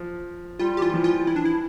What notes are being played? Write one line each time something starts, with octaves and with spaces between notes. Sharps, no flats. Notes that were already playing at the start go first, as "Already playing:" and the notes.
Already playing: F3
G3 F4
G4
E3 F4
F3
F4
E3 E4
D4
E4